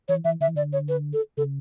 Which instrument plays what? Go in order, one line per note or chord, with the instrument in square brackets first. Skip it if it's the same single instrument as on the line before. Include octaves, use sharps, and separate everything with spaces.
[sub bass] E3 [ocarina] C#5
[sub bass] E3 [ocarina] E5
[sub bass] D3 [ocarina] E5
[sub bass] E3
[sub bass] D3 [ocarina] D5
[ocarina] C#5
B4
A4
[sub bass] C#3 [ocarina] A4